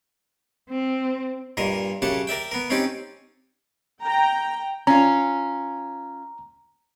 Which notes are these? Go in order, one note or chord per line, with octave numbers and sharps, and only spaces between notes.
C4
G2 A#2 A#4 D#5
F#2 C#3 G4 F#5 A5
A#4 D5 E5 G5
B3 A#4
C4 C#4 D#4 G4 D5
G5 A#5
C#4 F4 A#5